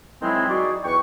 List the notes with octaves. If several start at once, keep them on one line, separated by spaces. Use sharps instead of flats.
D#3 F#3 G#3 C4 E4
D#4 F#4 G#4 D5
E2 B4 G5 C#6